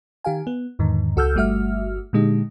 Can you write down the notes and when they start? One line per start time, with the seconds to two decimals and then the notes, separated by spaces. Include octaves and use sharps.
0.24 D#3 G4 F5 G#5
0.47 B3
0.79 E2 G#2 D3 D#3
1.16 C#2 F#4 A4 E6 F6 G6
1.35 G1 G3 A3 F#4 E5 F6
2.13 A#2 D3 G#3 D#4 G4